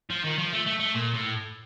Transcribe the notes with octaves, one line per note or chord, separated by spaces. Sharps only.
F3
D#3
F3
A3
A3
A3
A#2
A2